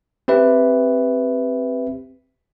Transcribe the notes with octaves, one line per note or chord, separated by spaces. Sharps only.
C4 G4 B4 E5